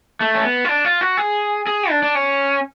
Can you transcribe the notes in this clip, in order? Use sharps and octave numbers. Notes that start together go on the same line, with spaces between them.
A3
C#4
B3
F4
D4
F4
F#4
G#4
G#4
D4
D4
C#4